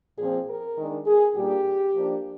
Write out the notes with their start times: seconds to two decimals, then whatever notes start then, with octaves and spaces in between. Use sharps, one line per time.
0.17 A#2 F3 C4 G#4
0.47 A#4
0.76 D#3 G#3 D4
1.06 G#4
1.36 A#2 G3 A#3 D4 G4
1.94 F3 A#3 D4